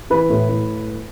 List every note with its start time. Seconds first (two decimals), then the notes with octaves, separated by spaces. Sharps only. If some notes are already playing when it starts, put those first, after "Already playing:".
0.10 E3 B4
0.30 A2
0.48 A2